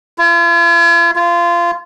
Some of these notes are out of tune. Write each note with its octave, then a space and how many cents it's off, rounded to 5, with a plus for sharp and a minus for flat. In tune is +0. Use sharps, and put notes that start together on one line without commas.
F4 -45
F4 -20